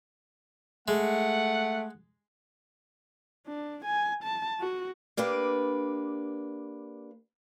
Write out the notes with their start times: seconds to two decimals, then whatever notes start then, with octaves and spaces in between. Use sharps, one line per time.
0.88 G#3 A3 F#5
3.47 D4
3.85 G#5
4.23 A5
4.60 F#4
5.17 A#3 D4 G4 B4